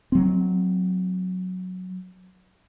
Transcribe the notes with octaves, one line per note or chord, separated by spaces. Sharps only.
F#3 C4